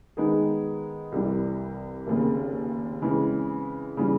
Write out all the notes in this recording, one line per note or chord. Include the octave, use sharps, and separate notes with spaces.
D#3 G#3 B3 D#4 G#4
C2 C3 E3 G3
F1 D#2 C#3
C#3 E3 G#3 C4
C#3 E3 G3